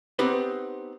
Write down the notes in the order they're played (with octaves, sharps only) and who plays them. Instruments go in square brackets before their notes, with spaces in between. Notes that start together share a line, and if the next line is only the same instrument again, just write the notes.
[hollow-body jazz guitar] B3 C4 D#4 G4 B4 C5